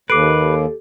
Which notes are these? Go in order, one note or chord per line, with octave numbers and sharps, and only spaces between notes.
D#2 G4 A4 B4 D6 C7 D7